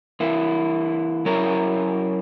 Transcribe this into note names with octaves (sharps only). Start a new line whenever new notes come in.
E3 A#3 E4
F#3 C#4 E4 A#4